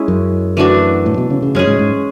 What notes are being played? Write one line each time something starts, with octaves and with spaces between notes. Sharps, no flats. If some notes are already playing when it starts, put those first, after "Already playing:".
Already playing: G#3 C#4 E4
F#2
E3 A3 D4 F#4
A2
B2
C#3
C#3
F#2 G#3 C#4 G#4
G#2
G#2